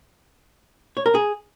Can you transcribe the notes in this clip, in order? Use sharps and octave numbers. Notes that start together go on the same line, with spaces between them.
C#5
A#4
G#4